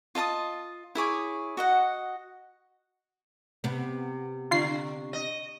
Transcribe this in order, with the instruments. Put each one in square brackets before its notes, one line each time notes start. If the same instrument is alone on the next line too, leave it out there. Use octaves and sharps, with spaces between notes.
[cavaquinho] F4 D#5 A5 D#6
E4 G#4 C#5 D6
F#4 D#5 F#5
[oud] C3 B3
[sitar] D3 [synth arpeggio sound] F4 C7
[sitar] D#5